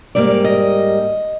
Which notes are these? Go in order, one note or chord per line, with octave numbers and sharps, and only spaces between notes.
G#2 G3 A#3 D5
D#5